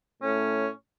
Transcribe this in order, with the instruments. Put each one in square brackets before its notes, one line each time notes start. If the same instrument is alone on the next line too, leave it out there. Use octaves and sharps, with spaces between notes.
[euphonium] A2 [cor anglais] C#4